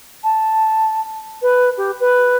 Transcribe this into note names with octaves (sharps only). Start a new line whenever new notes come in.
A5
B4
G4
B4